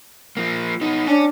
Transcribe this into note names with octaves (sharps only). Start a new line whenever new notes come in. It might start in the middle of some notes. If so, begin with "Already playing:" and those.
F3 A#3
B3 D#4
D4 C#5 G#5